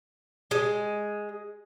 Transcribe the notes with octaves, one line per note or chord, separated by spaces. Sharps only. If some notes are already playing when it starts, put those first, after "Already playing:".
G#3